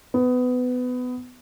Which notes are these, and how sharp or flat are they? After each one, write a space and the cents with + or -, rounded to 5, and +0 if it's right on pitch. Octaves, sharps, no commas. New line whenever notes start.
B3 +20